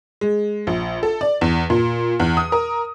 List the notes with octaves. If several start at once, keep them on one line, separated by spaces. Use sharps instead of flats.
G#3
A#1
A4
D5
E2
A#2
E2
D#6
A#4